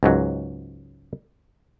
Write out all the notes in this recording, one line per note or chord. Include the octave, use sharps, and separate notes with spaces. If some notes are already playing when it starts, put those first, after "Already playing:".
C#2 G#2 F#3